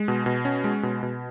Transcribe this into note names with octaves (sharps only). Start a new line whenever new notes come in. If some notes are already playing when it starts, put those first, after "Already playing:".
Already playing: G#3
B2
B2
C#4
G#3
B2
B2